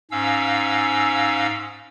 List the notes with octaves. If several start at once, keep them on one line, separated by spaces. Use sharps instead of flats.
G#2 C#4 F5 E6